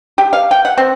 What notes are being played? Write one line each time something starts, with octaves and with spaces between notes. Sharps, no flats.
G4
F5
G5
F#5
C4